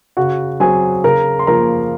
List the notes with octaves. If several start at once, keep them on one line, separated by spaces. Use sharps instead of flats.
C#3 F#4 F#5
F#3 C4 G#4 G#5
C#3 A#4 A#5
C6
F3 A#3 A#4 A#5